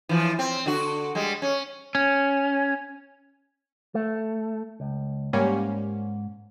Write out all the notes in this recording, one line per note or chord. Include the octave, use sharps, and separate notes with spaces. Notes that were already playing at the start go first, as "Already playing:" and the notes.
E3 F3
C4
D3 F#4
G3 G#3
C#4
C#4
A3
C#2
G#2 G3 A#3 C#4